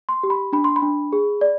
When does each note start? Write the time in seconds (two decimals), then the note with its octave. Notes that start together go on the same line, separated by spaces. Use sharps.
0.09 C6
0.23 G4
0.30 B5
0.53 D4 B5
0.64 C6
0.76 B5
0.82 D4
1.12 G#4
1.41 D5